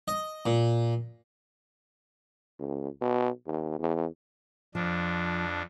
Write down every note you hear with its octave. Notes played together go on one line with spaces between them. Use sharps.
D#5
A#2
C#2
B2
D#2
E2
F2 F3 D4